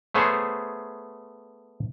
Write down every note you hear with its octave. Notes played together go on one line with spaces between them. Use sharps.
A3 B3 G#4 C5 C#5